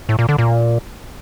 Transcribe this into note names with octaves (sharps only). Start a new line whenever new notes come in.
A2
A#2
D3
A#2